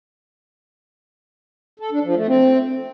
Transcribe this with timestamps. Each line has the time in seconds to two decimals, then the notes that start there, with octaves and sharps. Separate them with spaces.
1.80 A4
1.92 D4
2.04 F3
2.16 A3
2.27 C4